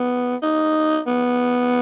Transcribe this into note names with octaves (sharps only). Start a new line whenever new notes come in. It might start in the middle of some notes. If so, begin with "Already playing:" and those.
Already playing: B3
D#4
B3